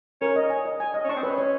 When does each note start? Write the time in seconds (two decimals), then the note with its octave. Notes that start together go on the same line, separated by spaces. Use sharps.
0.21 C#4 A#4
0.36 D#5
0.50 G#5
0.66 D#5
0.80 G#5
0.94 D#5
1.04 C#4
1.09 D4 C#6
1.16 C4
1.23 C#4 B4
1.38 C#5